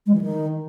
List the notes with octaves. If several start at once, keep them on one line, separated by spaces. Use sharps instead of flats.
G#3
E3
D#3